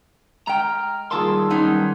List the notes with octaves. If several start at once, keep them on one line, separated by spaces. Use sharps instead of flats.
G#3 G5 A#5 F6
D#3 G3 A#3 F4 G#4 A5 C6 E6
F#3 G3 B3 C#4 D#4